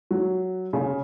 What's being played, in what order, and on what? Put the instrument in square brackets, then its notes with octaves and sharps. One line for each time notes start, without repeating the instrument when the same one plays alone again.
[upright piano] F#3
C#3